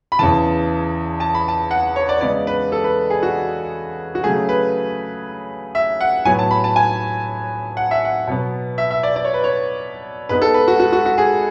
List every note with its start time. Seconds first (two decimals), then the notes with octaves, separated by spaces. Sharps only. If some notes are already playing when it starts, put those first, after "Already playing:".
0.12 B5
0.19 E2 C#3 E3 A5
1.20 A5
1.35 B5
1.48 A5
1.71 F#5
1.96 C#5
2.09 D5
2.21 C#3 G#3 B3 D5
2.47 B4
2.72 A4
2.84 B4
3.10 G#4
3.23 F#4
4.15 F#4
4.23 C#3 F#3 A3 G#4
4.49 B4
5.75 E5
6.01 F#5
6.25 A2 F#3 B3 G#5
6.39 A5
6.51 B5
6.64 A5
6.76 G#5
7.77 F#5
7.91 E5
8.05 F#5
8.27 B2 F#3 B3
8.78 E5
8.91 E5
9.03 D5
9.16 D5
9.25 C#5
9.34 B4
9.44 C#5
10.29 G#2 G#3 B3 B4
10.42 A4
10.54 B4
10.68 F#4
10.79 F#4
10.93 F#4
11.06 F#4
11.18 G#4